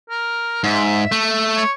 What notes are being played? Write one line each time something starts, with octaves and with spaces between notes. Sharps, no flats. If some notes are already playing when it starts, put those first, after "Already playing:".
A#4
G#2 E5
A3
C#5